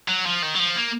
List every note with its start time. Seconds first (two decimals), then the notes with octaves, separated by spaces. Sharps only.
0.08 F#3
0.26 F3
0.42 D#3
0.54 F#3
0.59 F3
0.76 A#3